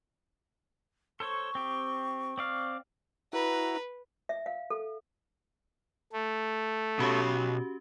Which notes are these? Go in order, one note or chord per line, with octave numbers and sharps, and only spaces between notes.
A4 C5 C#5 C#6
C4 G4
C4 D5 F5
E4 F#4 B4 A#5
E5
F5
A4
A3
B2 C#4 F#4 G4 C#5